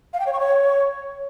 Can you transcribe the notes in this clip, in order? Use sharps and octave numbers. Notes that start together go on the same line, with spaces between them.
F5
G5
C#5
C#6
C#5